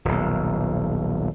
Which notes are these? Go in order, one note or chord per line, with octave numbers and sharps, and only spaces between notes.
D#1 B1